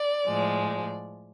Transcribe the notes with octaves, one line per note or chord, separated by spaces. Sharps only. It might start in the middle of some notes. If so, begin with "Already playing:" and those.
Already playing: D5
A2 F3 G#3